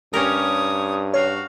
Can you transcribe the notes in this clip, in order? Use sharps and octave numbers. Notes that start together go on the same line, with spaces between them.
G2 C#4 G4 A#4 C#5 D#6
F#4 C#5 F5